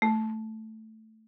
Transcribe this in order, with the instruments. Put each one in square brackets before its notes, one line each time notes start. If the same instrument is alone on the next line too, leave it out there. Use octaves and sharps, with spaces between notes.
[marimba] A3